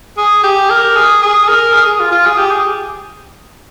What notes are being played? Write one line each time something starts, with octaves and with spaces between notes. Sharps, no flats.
G#4
G4
A#4
G#4
G#4
A#4
G#4
G#4
F4
F4
G#4
G4
G#4